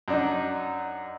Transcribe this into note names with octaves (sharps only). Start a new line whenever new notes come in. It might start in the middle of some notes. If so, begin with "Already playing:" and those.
F#2 D4 D#4